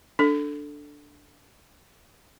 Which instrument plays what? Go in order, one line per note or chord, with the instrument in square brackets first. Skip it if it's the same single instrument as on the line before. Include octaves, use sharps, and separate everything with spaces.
[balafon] D4 A4